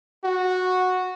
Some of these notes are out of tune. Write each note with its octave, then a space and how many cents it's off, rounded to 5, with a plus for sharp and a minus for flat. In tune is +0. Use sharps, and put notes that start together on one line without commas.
F#4 -10